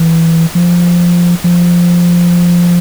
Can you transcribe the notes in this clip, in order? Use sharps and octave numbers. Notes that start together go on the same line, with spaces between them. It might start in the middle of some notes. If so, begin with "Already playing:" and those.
Already playing: E3
F3
F3